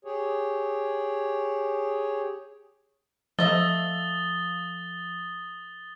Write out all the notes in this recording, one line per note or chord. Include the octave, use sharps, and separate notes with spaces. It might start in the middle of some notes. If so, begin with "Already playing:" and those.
G4 G#4 C#5
F3 A3 D#5 E5 D#6 A6 G7